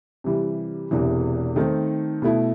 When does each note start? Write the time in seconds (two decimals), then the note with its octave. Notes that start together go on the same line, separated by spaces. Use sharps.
0.24 C3 E3 G3
0.91 E1 E2 C3 E3
1.56 D#3 A3 C4 D#4
2.22 B2 A3 E4